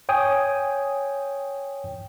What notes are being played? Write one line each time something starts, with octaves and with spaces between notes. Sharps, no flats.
C#5 G5 G#5 D#6